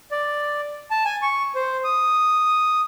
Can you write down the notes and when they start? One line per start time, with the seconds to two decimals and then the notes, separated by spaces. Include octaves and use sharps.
0.11 D5
0.91 A5
1.05 G#5
1.22 C#6
1.55 C5
1.84 D#6